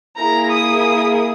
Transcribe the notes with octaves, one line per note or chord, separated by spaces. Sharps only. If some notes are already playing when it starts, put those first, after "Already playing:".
A#3 E4 G#4 A#5
D#6